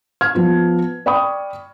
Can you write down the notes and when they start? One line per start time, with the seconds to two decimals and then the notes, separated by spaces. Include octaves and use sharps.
0.21 F6 G#6
0.35 F3 B3 F4
1.06 D5 G5 B5 C#6 D#6